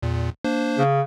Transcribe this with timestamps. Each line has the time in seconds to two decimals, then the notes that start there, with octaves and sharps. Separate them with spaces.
0.03 E2 A#2
0.44 A#3 D4 C5
0.78 C#3